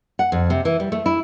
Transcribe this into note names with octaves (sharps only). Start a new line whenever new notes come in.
F#5
F2
C3
E3
G3
A3
E4